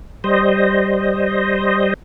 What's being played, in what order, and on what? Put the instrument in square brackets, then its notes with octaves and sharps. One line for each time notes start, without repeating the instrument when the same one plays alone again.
[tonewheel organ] G3 C5 D#5